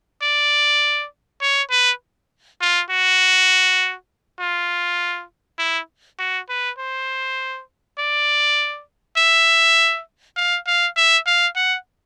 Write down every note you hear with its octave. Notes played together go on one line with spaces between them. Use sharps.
D5
C#5
B4
F4
F#4
F4
E4
F#4
B4
C5
D5
E5
F5
F5
E5
F5
F#5